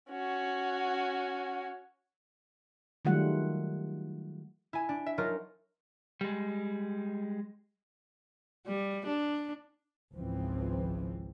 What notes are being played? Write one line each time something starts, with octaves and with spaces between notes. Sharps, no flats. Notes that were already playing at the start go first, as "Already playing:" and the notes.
C#4 F#4
D#3 F#3 G3 A3 F4 F#5
E4 G#5
D4
E5
F#3 D#4 F4 A#4
G3 G#3
G3
D4
G#1 C#2 E3 F3 C4